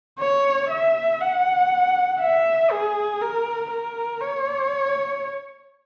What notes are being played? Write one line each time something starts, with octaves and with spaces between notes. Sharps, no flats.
C#5
E5
F#5
E5
G#4
A#4
A#4
C#5